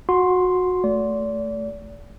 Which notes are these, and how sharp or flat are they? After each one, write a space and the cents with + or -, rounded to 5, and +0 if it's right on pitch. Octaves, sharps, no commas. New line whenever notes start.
F#4 -20 C6 +0
A3 +0 D5 -35